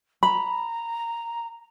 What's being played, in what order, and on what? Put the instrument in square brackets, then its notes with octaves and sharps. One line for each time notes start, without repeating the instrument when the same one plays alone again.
[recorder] A#5 [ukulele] B5